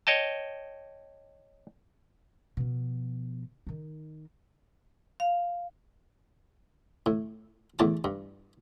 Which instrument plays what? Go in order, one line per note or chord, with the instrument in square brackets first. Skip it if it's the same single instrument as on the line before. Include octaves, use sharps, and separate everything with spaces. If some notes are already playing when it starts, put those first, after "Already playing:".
[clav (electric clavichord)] C#5 D#5 G5 A5
[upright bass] B2 F3
D#3 D#4
[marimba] F5
[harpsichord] A2
E2 A2 A5 D6
G2